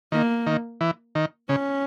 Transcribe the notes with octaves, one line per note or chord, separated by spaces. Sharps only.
D#3 A#3
D#3
E3
D#3
C#3 C#4